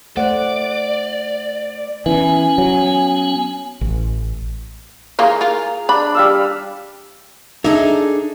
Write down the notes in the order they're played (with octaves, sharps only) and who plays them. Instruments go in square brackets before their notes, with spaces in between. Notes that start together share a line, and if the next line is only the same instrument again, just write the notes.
[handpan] A3 C5 F#5 [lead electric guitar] D5
[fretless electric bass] E3 [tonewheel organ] B3 C#4 [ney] G#5
[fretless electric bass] F#3
A1
[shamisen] E3 A#3 F4 [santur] G#4 A#5
[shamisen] F4 A#4
[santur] D4 [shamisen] B5
[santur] G3 F5 E6
[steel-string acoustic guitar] D4 G#4 A4 [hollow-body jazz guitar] D#4 E5